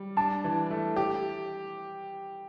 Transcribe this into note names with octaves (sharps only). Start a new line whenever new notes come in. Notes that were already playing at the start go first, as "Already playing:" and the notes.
Already playing: G3
D4 A5
E3
A3
G4